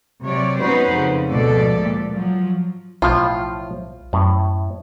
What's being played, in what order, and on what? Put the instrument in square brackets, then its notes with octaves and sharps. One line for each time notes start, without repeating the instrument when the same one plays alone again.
[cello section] C3 F#3 C#5 D5
B3 C#4 D#4 F#4 B4 C5
F2 C#3
D2 G#2 B2 F3 A4 D5
A#2
F3 F#3
[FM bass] B1 [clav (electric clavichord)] A2 F3 [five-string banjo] F4
[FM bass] F#2 [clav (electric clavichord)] A2